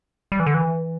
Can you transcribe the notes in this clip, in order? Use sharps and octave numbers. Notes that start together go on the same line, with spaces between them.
G3
E3
D3
E3